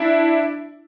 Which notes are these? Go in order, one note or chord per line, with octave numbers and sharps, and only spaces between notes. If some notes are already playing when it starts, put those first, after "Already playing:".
Already playing: D4 E4